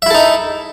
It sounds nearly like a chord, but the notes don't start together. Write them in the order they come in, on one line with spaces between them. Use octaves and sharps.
E5 E4 A4 D#4